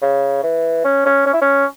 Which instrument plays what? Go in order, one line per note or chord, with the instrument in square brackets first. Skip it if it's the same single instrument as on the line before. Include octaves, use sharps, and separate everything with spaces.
[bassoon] C#3
E3
C#4
C#4
C#4
E4
C#4